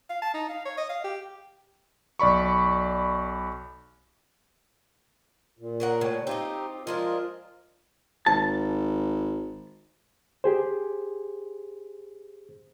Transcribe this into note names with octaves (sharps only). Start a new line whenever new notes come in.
F5
A5
D#4
F5
C#5
D#5
F5
G4
B1 D5 B5 C#6
A#2
C#3 A#4 F#5
A2 C#3 G3
C4 D#4 F4 G4 D#5
F3 G#3 D4 F4 A#4 D#5
G#1 A5
G4 G#4 C5